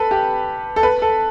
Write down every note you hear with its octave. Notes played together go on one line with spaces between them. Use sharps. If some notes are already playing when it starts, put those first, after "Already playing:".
Already playing: A4 B4
G4
A4
B4
A4